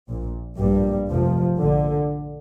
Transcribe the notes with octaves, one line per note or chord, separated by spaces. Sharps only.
A#1 A#2
A#1 G2 A#2 G3
F1 F2 C3 F3
A#1 A#2 D3